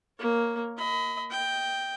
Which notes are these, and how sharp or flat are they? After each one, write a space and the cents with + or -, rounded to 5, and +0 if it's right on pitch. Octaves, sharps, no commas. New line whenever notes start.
A#3 +0 C#5 +0
D#5 +30 B5 +30
D#5 +10 G5 +0